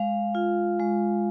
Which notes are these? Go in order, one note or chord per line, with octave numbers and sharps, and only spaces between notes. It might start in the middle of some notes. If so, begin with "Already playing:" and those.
Already playing: G#3 F5
F4
G#3